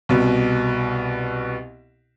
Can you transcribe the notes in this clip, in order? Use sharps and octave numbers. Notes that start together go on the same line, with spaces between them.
C2 B2